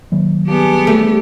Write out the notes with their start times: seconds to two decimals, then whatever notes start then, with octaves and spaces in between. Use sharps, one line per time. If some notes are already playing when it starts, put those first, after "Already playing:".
0.12 D#3 F#3 A#3
0.48 G2 B3 G4 G#4 A5
0.87 A3